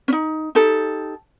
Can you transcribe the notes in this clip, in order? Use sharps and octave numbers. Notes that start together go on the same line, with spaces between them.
C#4 D#4
D#4 G4 A4